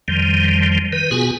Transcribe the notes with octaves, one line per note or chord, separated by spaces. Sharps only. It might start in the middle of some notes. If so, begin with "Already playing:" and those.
F2 D#3 F3 G3
D#3 B4
B2 B3 F4 F#4 G#4 G#5